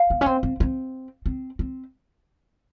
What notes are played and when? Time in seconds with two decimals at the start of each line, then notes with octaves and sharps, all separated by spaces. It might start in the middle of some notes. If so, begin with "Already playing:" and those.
Already playing: F5
0.10 B3
0.21 C#4
0.26 C4
0.43 C4
0.60 C4
1.26 C4
1.59 C4